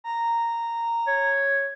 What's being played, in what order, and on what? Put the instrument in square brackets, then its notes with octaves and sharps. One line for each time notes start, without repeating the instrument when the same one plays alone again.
[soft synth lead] A#5
[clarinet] C#5